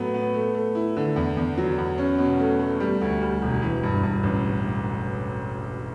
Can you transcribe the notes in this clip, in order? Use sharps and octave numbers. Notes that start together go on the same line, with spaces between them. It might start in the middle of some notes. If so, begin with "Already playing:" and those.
Already playing: A2 F#3 B3
B3
A3
A3
E4
D3
E2
E2
F#3
E2
C#4
B2
A3
A3
G3
D2
G3
E1
E3
G2
G2
A1